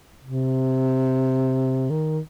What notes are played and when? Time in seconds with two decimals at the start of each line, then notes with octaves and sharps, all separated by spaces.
0.24 C3
1.90 D#3